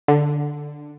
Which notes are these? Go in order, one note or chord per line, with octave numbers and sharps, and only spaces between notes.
D3